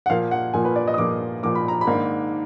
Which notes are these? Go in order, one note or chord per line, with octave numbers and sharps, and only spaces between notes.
F#5
A#2 F3 A#3 F5
F#5
A#2 F3 A#3 G#5
B4
D5
D#5
D#6
A#2 F3 A#3 D6
A#2 F3 A#3 D6
B5
A#5
B5
G#2 D#3 A#3 D4